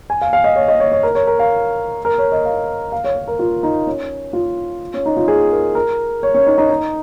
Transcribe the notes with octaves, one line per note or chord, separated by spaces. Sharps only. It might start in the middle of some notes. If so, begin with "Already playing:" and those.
G#5
F5
F5
D#5
C#5
D#5
C#5
C#5
A#4
C#5
A#4
F5
A#4
C#5
D#5
F5
F5
C#5
C#5
A#4
F4
D#4
C#4
F4
C#4
D#4
F4
G#4
A#4
A#4
C#5
C#4
D#4
D#4
D#4